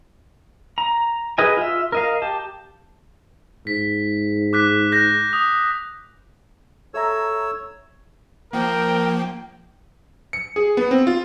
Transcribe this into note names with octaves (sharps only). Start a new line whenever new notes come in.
A#5
G#4 B4 D#5 G#5
F4 E5
A#4 D#5 F5
G4 A5
G#2 B6
D6 F#6 B6
F#6 G6 A#6
D#6
A4 C#5 E5 A#5 E6
F3 A#3 A#4 G5
C#7
G#4
B3
C4
F4